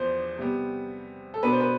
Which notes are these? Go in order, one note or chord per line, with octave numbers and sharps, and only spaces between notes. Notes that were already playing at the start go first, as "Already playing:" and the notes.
Already playing: E2 F3 B3 C5 D5
C3 G3 B3
A4
B2 B3 D4 B4
C5
B4